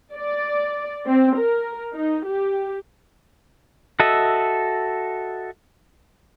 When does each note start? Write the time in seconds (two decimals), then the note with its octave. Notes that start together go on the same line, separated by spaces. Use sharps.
0.15 D5
1.06 C4
1.36 A#4
1.94 D#4
2.25 G4
4.00 F#4 A4 D#5 E5